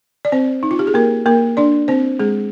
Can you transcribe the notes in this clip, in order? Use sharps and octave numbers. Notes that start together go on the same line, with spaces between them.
D5
C4 C5
D#4
F4
G4
G#4
A#3 A#4
A#3 A#4
D4 D5
C4 C5
G#3 G#4